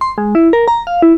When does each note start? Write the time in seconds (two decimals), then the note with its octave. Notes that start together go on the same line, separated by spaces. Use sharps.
0.01 C6
0.18 G#3
0.35 E4
0.53 A#4
0.68 A#5
0.87 F5
1.02 E4